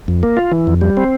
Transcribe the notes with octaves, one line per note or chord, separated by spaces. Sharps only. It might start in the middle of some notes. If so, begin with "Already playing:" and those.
F2
A#3
F4
E3
F2
G3
C4